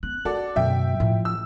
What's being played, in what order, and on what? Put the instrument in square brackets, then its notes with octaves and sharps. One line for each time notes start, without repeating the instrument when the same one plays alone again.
[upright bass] B3 [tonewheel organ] F#6
[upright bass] C4 [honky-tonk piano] F#4 A4 D5
[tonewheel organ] F#2 B2 F#3 [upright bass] D3 [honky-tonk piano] E5 G5
[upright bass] A2 [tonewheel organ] F3
[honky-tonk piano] E6